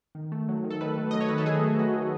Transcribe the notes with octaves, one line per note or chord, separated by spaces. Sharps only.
D#3
A3
F#3
D#3
A4
D#3 B4
A3
F#3 D#5
C#5
D#3 B4
A4
D#3 G#4
A3
F#3 F#4
D#3